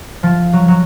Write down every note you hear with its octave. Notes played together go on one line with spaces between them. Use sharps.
F3
F#3
F#3